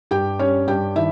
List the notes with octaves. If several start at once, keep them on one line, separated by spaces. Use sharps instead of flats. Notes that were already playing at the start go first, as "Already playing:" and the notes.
G2 G4 G5
G3 C#4 C#5
G2 G4 G5
D#3 E4 E5